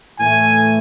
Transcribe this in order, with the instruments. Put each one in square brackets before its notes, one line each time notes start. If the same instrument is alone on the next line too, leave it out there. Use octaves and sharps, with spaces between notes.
[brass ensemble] A2 E3 A3 G#5